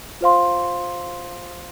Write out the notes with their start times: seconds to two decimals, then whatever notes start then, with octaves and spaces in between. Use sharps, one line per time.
0.21 F4 C5 F5 C6